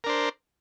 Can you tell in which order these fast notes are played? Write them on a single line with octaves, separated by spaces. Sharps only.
A#4 D4 C5